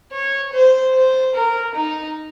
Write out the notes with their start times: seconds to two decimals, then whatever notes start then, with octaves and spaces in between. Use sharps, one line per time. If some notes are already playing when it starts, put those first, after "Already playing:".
0.12 C#5
0.53 C5
0.94 C5
1.35 A#4
1.76 D#4